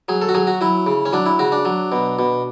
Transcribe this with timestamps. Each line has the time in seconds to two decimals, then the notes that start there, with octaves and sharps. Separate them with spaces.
0.09 F#3 G#4
0.22 A4
0.29 F#4
0.35 F#3 G#4
0.47 F#4
0.61 F#3 E4
0.86 C#3
1.06 C#4
1.13 F#3 D4
1.26 E4
1.39 C#3 F#4
1.52 D4
1.65 F#3
1.92 B2
2.19 B2